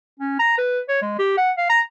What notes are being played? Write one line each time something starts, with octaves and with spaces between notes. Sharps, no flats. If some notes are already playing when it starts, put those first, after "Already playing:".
C#4
A#5
B4
C#5
G#3
G4
F#5
F5
A#5